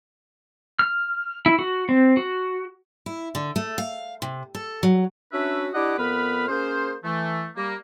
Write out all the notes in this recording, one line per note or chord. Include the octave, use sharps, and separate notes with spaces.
F6
E4
F#4
C4
F#4
E4
D3
A3
F5
C3
A4
F#3
C#4 D4 F#4 B4 E5
D4 E4 G4 D#5 F#5 D6
F2 B3 A#4 B4 B5 F6
A#3 C#4 G#4 C5
E3 A3
G3 A#3